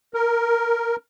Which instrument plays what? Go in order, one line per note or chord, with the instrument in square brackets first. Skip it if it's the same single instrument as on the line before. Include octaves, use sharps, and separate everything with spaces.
[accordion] A#4